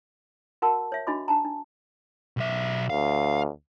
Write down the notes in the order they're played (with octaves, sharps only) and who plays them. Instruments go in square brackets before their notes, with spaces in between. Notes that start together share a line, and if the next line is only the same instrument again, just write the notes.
[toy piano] F#4 A#4 F#5 A5 E6
C#5 E5
D4 F#4 D#5 B5 D6
D4 A5 A#5
D4
[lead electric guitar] B1 E5
[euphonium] D2 [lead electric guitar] F5